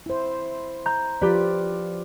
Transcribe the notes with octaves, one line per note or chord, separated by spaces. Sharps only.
E4 C5
A#5 G6
F3 F4 G4 B4 D5